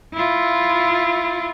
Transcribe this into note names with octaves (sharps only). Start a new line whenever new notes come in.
E4 F4